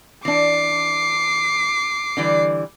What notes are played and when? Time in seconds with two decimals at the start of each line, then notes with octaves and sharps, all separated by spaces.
0.25 E3 D4 D6 C7
2.17 D3 E3 G3